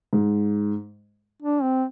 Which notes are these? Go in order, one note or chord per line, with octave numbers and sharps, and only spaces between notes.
G#2
D4
C4